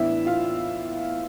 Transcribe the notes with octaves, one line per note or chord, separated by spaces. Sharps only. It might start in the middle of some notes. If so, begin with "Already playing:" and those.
Already playing: A2 E3 B3 D4 E4 E5
F4 F5